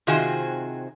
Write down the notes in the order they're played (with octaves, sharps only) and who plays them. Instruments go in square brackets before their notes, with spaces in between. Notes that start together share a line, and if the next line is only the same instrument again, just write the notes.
[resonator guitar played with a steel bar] C3 D#3 C4 F4 F#4 G#4